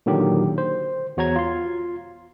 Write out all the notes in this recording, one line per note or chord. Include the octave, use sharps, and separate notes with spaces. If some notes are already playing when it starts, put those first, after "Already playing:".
A#2 D3 D#3 F#3 G4
C5
E2 F#4 C#5 A#5 G#6
F4 C6